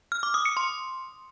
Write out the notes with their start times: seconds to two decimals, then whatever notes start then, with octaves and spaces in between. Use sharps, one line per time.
0.12 F6
0.23 D6
0.34 D#6
0.45 C#7
0.57 C6